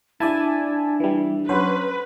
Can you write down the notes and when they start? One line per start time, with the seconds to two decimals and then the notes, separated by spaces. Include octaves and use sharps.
0.20 D4 E4 D5 G#5 A5
1.00 E3 G3
1.49 F#3 C#4 B4 C5